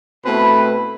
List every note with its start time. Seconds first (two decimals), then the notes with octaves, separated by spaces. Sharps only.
0.24 B2 A3 C4 E4 B4 B5